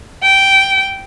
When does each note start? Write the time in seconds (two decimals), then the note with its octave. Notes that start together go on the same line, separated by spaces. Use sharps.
0.24 G5